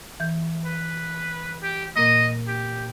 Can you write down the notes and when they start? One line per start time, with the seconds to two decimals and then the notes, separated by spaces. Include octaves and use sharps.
0.20 E3 G6
0.66 B4
1.63 G4
1.96 A#2 A#3 D#5
2.48 G4